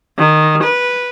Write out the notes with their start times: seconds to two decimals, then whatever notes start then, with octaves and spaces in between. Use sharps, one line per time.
0.18 D#3
0.63 B4